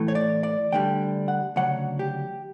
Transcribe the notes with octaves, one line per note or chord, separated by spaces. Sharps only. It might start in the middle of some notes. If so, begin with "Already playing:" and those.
Already playing: A2 E3 A3
C#5
D5
D5
D2 D3 G3 G5
F#5
D2 C#3 F#3 F#5
G4